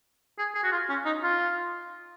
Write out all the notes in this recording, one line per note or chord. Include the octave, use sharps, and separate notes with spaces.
G#4
G#4
F#4
F4
C#4
D#4
F4